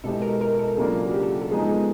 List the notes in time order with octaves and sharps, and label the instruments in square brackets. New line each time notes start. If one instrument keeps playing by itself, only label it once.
[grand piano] B2 G#3 B3 E4 G4 [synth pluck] A4
[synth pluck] A#4
A#4
A4
[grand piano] C#3 F#3 A#3 D4 F4 [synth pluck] G#4
[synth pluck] F#4
G4
A4
A4
[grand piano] F3 G#3 B3 D#4 [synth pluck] G#4
[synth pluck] A4
G#4